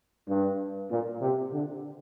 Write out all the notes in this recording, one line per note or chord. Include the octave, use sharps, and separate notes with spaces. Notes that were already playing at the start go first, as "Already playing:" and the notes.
G2
A#2
C3
D3